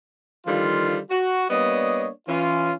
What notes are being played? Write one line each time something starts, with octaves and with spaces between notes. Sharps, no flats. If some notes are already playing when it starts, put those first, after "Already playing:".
D3 D#3 F3 G3 F4
F#4
G3 A#3 B3 D4 C#5 D#5
E3 C#4 F4